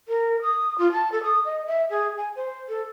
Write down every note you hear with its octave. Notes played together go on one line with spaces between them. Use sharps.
A#4
D#6
F4
A5
A4
D#6
D#5
E5
G#4
G#5
C5
A4